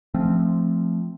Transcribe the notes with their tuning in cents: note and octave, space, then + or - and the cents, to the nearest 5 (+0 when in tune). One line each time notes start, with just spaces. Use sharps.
F3 -10 A3 +0 C4 +0